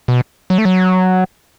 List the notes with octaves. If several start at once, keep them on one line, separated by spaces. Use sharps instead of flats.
B2
F#3
A3
F#3